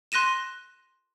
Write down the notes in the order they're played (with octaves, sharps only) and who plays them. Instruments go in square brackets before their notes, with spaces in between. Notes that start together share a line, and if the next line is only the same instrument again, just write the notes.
[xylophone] C6 F#6 A#6 D#7 E7